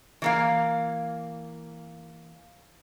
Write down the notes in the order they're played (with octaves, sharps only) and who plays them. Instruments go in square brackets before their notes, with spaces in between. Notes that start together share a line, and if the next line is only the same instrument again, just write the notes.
[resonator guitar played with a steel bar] E3 A#3 F5